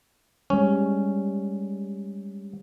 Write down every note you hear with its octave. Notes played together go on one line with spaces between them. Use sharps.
G3 G#3 C#4